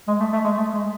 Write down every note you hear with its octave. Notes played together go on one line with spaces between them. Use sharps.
G#3
A3
A3
G#3
A3
G#3